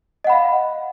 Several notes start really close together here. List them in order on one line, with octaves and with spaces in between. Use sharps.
D#5 F#5 B5 F5